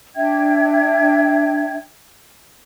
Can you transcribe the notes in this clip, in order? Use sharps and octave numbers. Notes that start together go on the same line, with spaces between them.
D4 E5 G5 G#6